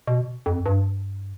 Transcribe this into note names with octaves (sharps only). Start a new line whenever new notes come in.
B2
F2
G2